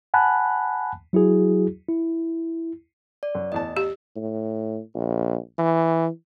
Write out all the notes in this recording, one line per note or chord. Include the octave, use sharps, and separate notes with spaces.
F#5 G#5 A5 B5 F#6
F#3 E4 F#4 G#4
E4
D5
F#2
A1 E2 D#5 A5
G4
A2
A#1
E3